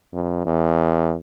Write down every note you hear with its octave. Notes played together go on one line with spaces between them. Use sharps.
F2
E2